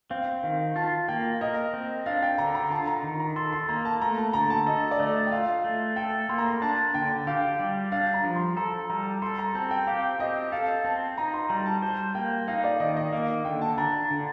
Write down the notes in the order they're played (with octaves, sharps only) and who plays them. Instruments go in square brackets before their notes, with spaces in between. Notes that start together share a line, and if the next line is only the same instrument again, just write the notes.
[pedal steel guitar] C4 [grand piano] F5
[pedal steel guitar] D#3 [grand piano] F5
[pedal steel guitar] F4 [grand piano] A5
[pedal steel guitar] A#3 [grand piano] G5
[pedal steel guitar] A#4 [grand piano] D#5
[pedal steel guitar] C4
[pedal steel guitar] D4 [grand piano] F5
[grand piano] G5
[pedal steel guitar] D3 [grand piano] A#5
[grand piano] A#5
[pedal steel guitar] F4 [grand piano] A5
[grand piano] A#5
[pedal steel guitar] D#3
[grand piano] A#5
[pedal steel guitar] A4 [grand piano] C6
[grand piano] C6
[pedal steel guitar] A#3 [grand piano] A#5
[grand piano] A5
[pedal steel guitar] A3 [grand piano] A#5
[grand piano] A5
[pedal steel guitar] D3 [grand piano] A#5
[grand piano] A5
[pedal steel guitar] A4 [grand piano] D#5
[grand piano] D5
[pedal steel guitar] A3 [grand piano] D#5
[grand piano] G5
[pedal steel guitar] F4 [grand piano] F5
[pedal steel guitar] A3
[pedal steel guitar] A4 [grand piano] G5
[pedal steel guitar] A#3 [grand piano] C6
[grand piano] A#5
C6
[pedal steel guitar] D4 [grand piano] A5
[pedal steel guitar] D3 [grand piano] G5
[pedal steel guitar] G4 [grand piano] F5
[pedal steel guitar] G3
[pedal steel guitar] D4 [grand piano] F5
[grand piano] A#5
[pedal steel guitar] F3
[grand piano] C6
[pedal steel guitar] A4 [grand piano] A#5
[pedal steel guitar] G3 [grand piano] A#5
[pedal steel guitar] A4 [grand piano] C6
[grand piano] A#5
[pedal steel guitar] C4 [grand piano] A5
[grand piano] G5
[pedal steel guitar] G4 [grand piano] F5
[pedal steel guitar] C4 [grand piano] D#5
[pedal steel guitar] A4 [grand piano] F5
[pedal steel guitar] C4 [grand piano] A5
[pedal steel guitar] D#4 [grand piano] A#5
[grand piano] C6
[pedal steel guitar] G3 [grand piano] A#5
[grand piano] A5
[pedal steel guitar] C5 [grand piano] A5
[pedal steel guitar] A#3 [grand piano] G5
[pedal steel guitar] D#4 [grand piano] F5
[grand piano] D5
[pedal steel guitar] D#3 [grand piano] D#5
[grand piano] D#5
[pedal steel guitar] A#3 [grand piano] F5
[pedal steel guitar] D3 [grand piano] G5
[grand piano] A5
[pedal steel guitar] D4 [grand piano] A#5
[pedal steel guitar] D3